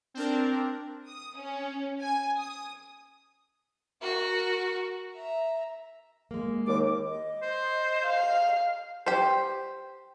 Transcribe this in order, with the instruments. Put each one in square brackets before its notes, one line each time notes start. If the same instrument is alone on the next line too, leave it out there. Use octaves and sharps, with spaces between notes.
[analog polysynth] C4 D4 A#4
[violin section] D#6
C#4
G#5
D#6
[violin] F#4 A#4
E5 A#5
[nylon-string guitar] G#3 A#3
[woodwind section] D#2 D6
[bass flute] D#5
[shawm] C5
[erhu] F5
[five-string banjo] G4 C5